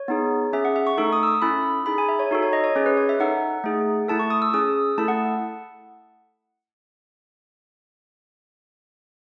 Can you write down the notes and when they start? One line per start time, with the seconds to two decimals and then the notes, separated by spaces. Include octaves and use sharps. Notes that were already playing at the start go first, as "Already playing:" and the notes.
Already playing: C#5
0.08 B3 D#4 G#4
0.53 C#4 G#4 E5
0.65 F#5
0.76 E5
0.87 C#6
0.98 A3 D#4 A4 C#6
1.13 D#6
1.23 E6
1.27 D#6
1.42 C#4 E4 A4 B5
1.86 D#4 G#4 B5
1.98 G#5
2.09 E5
2.19 C#5
2.31 D#4 F#4 A4
2.42 C#5
2.53 D#5
2.64 C#5
2.76 C#4 G#4
2.86 B4
2.97 C#5
3.09 E5
3.20 D#4 A4 F#5
3.64 A3 D#4 G#4
4.08 A3 E4 A4 A5
4.19 C#6
4.30 D#6
4.42 E6
4.54 C#4 G#4 D#6
4.98 A3 E4 A4 A5
5.08 F#5